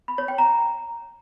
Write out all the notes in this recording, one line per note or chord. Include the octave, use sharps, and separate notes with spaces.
B5
C#5
G5
A#5